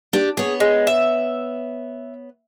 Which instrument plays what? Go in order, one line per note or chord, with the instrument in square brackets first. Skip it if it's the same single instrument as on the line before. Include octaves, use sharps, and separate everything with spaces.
[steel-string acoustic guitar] D4 G4
[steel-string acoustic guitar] B3 C#5 [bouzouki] G#4
[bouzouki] G#3
E5